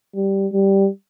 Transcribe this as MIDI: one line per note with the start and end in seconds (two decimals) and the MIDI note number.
0.15 0.47 55
0.53 0.89 55